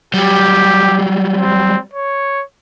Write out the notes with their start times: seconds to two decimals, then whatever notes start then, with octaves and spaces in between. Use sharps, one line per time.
0.14 F#3 G3 G4
1.35 C4
1.93 C#5